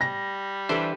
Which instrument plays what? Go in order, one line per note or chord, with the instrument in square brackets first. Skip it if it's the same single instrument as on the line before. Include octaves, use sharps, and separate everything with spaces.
[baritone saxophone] G3 [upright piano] A#6
[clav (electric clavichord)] E3 D4 C5 [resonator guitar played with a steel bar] G4 A4 B4